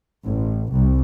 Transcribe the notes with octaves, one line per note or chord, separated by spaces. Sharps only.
A1
C2